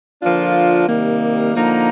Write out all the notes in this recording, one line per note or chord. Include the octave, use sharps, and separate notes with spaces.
D3 F3 A#3 D4 F4
C3 D#3 G3 A#3
D3 F3 A#3 D#4